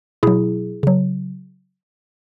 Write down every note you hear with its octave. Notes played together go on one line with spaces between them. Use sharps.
B2 F#3 E4 G#4
C#3 F#3